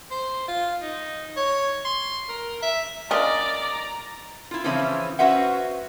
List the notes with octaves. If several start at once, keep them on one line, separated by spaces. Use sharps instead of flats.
C5
F4
D#4
C#5
C6
A#4
E5
C#4 D4 F4 A#4 D5 D#5 A#5
E4 F4
C#3 E3 F3 C4 C#4 E4
C#4 F#4 B4 C5 E5 F#5